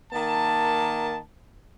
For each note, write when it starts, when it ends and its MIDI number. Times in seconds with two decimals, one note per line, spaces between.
0.12 1.17 51
0.12 1.17 58
0.12 1.17 81